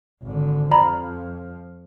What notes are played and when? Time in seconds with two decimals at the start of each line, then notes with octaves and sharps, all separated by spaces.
0.23 G#1 D3
0.71 F2 F3 D5 A#5 B5